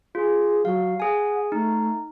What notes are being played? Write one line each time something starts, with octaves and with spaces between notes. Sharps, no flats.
F4 G#4
F#3 F5
G#4 F#5 G#5
A3 D#4